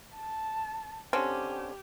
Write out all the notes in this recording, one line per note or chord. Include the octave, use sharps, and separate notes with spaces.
A5
D3 C4 C#4 G4